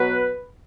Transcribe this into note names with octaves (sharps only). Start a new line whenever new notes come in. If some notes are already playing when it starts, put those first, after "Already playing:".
Already playing: B2 F#3 B3 B4